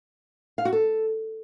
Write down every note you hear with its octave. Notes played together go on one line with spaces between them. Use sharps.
F5
F#4
A4